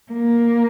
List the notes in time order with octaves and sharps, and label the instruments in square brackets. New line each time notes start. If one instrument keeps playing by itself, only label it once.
[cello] A#3